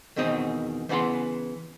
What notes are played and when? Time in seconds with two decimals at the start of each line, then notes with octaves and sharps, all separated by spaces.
0.16 E2 B2 D#3 C4 D#5
0.89 C#3 E3 B3 F#5 C6